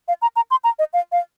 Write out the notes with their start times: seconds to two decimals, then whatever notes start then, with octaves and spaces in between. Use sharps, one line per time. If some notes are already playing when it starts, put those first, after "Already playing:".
0.08 F5
0.22 A#5
0.36 A#5
0.51 C6
0.64 A#5
0.79 D#5
0.93 F5
1.12 F5